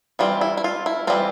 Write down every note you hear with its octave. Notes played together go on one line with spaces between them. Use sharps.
E3 G3 C4 F4
E4
E4
F4
E4
E3 G3 C4 F4